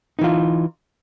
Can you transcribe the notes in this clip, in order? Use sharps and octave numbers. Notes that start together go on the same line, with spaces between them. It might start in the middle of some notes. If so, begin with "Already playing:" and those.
E3 D#4 F4